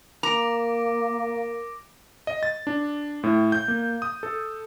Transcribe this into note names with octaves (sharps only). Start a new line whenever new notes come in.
A#3 A#4 A#5 D6 A#6 D7
D#5
A6
D4
A2
G6
A#3
D#6
A4